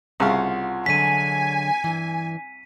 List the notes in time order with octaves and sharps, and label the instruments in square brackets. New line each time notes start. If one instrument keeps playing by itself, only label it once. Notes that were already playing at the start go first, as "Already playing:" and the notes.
[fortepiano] C2 C#3 F5 [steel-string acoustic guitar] F4 F#5
[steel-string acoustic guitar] D3 F#3 G#3 [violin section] G#5 [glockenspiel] B6 D#7
[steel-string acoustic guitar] G2 E3